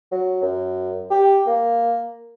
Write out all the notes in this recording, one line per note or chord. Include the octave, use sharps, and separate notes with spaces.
F#3
F#2
G4
A#3